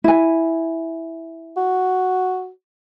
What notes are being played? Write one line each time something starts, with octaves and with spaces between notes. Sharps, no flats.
E4 G#5
F#4